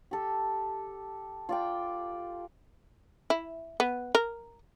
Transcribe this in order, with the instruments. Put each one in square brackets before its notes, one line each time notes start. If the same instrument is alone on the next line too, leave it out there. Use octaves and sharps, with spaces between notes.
[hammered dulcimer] G4 A4
F4 D5 G5
[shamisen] E4
B3
A#4